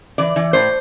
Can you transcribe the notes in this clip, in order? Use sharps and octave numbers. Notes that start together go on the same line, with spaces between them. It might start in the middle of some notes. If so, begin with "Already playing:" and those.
E3 D5
E3
A2 C5